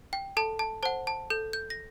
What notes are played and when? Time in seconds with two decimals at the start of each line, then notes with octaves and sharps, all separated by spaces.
0.13 G5
0.37 A4 A5
0.59 A5
0.83 C5 F#5 A5
1.07 A5
1.30 A4 G6
1.53 G6
1.70 A#6